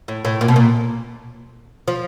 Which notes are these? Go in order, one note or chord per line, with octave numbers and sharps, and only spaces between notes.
A2
A2
A#2
B2
A#2
F3